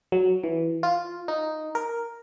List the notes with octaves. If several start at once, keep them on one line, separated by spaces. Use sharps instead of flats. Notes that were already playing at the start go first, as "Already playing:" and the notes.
F#3
E3
F4
D#4
A#4